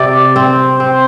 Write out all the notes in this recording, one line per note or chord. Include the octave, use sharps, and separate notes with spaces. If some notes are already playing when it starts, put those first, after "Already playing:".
Already playing: C3 D5
C4 C5
C4